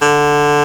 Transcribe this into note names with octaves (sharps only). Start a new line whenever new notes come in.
D3